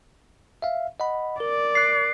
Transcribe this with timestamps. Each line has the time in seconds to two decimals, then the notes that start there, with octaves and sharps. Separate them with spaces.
0.62 E5 F5
1.00 D#5 F#5 B5
1.40 A#4 D5
1.75 F#6 C7